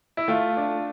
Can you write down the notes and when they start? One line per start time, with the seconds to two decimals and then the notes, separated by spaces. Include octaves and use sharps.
0.17 E4
0.28 A3 F4
0.57 D4